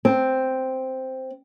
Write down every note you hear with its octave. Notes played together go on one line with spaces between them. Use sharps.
C4